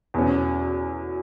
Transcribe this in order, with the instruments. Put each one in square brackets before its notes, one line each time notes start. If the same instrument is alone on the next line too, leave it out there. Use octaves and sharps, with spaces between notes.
[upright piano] E2 B2 F#3 C#4